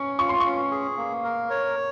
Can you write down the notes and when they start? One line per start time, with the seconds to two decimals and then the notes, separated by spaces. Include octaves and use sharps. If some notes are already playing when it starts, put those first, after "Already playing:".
Already playing: C#4 C#6
0.19 F4 C#6
0.29 C6
0.40 C#4 C#6
0.71 G#4
0.97 A#3
1.24 A#4
1.50 C#5